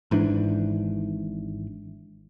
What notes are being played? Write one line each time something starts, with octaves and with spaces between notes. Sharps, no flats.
G#1 G#2 E3 D4